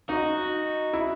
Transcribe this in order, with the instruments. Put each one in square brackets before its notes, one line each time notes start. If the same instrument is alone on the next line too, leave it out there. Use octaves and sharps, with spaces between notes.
[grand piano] D#4 [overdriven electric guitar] F#4
[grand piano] E4